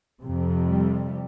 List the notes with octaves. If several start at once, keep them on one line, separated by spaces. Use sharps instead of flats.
F2 C3
G3